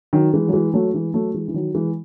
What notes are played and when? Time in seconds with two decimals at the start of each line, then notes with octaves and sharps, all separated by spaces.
0.13 D#3 F#3
0.34 E3 G#3
0.48 F#3
0.53 E3 G#3
0.74 F#3 A3
0.94 E3 G#3
1.14 F#3 A3
1.34 E3 G#3
1.48 E3
1.54 D#3 F#3
1.74 E3 G#3